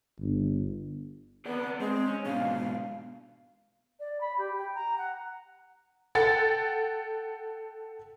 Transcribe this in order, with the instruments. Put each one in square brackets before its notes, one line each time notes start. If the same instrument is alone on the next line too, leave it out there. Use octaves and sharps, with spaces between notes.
[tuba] G1
[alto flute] B3 [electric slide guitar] G#4 D5 F#5
[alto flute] G#3 [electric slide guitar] C4
[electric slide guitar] C#4
[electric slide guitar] G#2 B2 D4 [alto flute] F5
[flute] D5
B5
G4
G5
A#5
F#5
[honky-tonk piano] A4 F#5 G5 A6